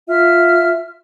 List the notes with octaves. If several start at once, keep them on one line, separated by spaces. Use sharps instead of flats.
F4 E5 F6